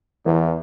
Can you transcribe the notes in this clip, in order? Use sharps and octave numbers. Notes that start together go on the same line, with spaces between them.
E2 E3